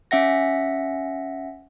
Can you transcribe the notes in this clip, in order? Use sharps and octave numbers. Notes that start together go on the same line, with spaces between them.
C#4 E5 F#5 A#6